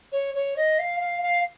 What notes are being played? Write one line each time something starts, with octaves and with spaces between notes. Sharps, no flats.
C#5
C#5
D#5
F5
F5
F5